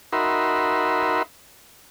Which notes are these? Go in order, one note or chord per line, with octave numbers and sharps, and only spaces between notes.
D#4 F#4 A#4 E5 B5 C6